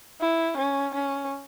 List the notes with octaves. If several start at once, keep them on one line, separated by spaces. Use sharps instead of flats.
E4
C#4
C#4